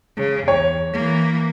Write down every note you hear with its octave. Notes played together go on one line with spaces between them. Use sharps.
C#3
E2 C#5
E3 A#3